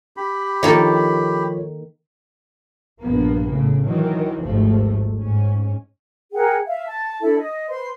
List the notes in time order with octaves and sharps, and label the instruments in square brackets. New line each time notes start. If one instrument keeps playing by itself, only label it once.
[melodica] G4 B5
[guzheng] D#3 A#3 A4 [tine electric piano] F3 F4 C#5
[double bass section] A#1 G2 F3 A#3 B3
A2 C#3
D#3 E3 F#3
G#1 D#2 G#2 F3 A3
G#2 C#4
[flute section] G#4 A#4 F#5 G5
E5 F5
A5
D4 E4 A4
D#5
B4 C5 C6